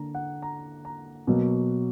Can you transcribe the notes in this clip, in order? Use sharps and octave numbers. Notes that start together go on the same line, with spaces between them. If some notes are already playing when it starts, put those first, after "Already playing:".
Already playing: D3 A#3 A#5
F#5
A#5
A#5
B2 F#3 A#3